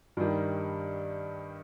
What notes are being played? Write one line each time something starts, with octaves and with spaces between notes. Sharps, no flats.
G2 D#3 G3